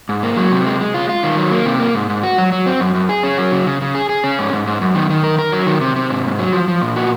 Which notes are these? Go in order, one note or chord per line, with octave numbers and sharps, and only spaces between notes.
G#2
A#3
F#3
C3
G#3
G#3
F4
F4
D#3
F#3
A#3
C3
A#3
G#2
G#2
F#4
F#3
F#3
C4
F#2
F#2
G#4
C#4
F#3
C#3
C#3
C#3
G#4
G#4
C#4
G#2
G#2
G#2
F#2
D#3
D#3
A#4
A#4
F#3
D#3
C3
C3
G#2
G#2
F#3
F3
F3
A#2
F#4